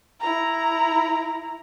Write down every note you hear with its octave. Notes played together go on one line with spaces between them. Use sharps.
E4 A#5